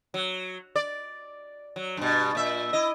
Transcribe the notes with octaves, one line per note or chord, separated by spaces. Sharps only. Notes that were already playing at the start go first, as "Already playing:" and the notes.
F#3
D5
F#3
G2 B2
A#2 E5
E4 D#5